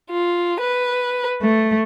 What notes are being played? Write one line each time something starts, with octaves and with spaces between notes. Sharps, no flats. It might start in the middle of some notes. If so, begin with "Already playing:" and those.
F4
B4
A3